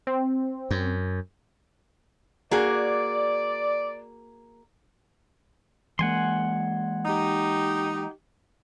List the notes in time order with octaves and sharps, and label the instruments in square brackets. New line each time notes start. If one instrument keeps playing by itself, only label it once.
[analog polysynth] C4
[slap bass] F#2
[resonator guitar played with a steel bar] A#3 F#4 G#4 [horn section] D5
[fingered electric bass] E3 G#3 A#3 [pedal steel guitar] F#5 G#5 C6
[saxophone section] D#4 G4